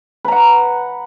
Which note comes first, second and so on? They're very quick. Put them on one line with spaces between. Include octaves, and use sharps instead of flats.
B4 A#5 F#5